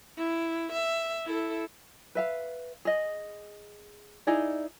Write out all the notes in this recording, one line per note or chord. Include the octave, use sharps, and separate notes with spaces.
E4
E5
E4 A4
B4 E5 F5
G#4 D#5
D#4 E4 G#4 D5